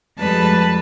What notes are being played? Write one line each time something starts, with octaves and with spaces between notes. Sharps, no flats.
F2 G3 G#3 B4 A5 B5